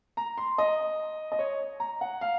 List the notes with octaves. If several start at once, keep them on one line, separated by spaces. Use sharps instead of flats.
A#5
C6
D#5
D#5
C#5
A#5
F#5
F5